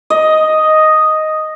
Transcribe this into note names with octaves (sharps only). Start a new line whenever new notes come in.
D#5